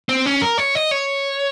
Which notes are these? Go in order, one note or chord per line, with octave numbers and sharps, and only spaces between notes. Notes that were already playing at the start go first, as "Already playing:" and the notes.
C4
C#4
A#4
C#5
D#5
C#5